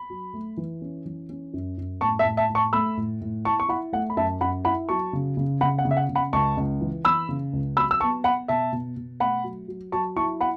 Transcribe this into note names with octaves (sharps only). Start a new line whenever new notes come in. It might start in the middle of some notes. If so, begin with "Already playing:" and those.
Already playing: B5
F#3
A3
E3
C#4
E3
C#4
F#2
F#2
A2 A5 C#6
E5 A5
A2
E5 A5
A2
A5 C#6
A3 B5 E6
A2
A2
E4 A5 C#6
C#6
E4 F#5 B5
A3 F#5
B5
F#2 E5 A5
F#2 F#5 B5
E4 F#5 B5
F#3 A5 C#6
C#3
C#3
C#3 F#5 B5
F#5
C#3
E5
F#5
C#3
F#5 B5
C#2 A5 C#6
C#2
E3
E3 B5 E6
C#3
C#2
F#3 B5 E6
E6
B3 A5 C#6
B3 F#5 B5
B2 E5 A5
B2
B2
A3 F#5 B5
F#3
F#3
F#3 A5 C#6
E4 A5 C#6
F#5 B5